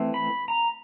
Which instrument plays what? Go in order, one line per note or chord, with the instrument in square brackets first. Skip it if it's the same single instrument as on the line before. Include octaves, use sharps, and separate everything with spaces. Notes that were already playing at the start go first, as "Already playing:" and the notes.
Already playing: [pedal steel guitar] E3 A3 C4
B5
A#5